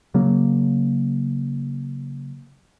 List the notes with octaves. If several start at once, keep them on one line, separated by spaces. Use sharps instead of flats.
C#3 F#3 A#3